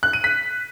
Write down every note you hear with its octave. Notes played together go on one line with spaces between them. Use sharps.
F#6
D#7
B6